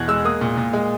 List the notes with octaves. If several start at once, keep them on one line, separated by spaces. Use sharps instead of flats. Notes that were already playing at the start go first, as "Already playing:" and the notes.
Already playing: E2 B2 F#6 G#6
G#3 E6
A#3 D#6
A#2
A#2
G#3